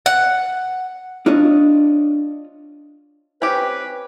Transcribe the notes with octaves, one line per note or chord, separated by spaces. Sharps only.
F#5
D4 F4 C#5 D#5
C4 C#4 G4 B4